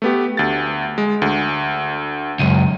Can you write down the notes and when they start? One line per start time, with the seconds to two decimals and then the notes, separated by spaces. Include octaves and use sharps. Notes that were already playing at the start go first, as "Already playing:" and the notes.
0.02 A3 B3 G4
0.37 D2 A6
0.98 G#3
1.22 D2
2.39 C#2 F#2 D#7